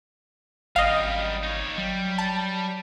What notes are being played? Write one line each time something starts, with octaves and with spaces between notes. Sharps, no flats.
G#1 F#2 G3 D#5 F5
D#4 C#5
F#3 G3
A5